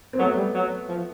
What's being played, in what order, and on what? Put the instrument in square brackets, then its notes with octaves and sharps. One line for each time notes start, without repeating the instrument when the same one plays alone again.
[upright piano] C4
[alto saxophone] F#3 [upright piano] A3 B3
[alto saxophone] G3
F#3
F3